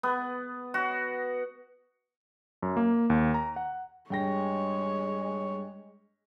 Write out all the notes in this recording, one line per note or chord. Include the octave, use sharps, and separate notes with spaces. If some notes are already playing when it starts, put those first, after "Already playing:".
B3
F#4
F#2
A#3
D#2
A#5
F#5
G2 G#3 C#5 G5 A#6